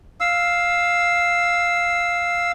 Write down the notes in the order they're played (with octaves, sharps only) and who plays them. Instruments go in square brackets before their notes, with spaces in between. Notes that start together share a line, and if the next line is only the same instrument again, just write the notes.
[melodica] F5 E6